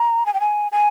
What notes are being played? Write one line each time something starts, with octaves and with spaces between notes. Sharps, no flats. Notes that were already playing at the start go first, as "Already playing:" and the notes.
Already playing: A#5
G#5
G5
G#5
G#5